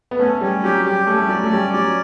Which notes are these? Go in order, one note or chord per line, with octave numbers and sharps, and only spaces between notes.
B3
A3 C#4
G3 C#4
F#3 G4
G3 G4
A3 C#4
G3
F#3 D5
A3
G3 C#4
F#3 D5